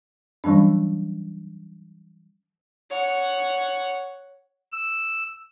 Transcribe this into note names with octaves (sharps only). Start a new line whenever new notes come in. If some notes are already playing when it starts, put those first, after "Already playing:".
E3 F#3 G3 C#4 D4
C#5 F#5
E6